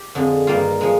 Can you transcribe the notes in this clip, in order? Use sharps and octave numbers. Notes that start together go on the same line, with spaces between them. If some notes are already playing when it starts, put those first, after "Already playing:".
Already playing: G4
F2 D3 F3 G#3
G2 D#3 G3 A#3 F4
F3 G#3